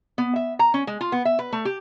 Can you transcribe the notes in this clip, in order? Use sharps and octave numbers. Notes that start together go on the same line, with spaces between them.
B3
E5
A#5
C#4
G#3
F4
B3
E5
B4
A3
G4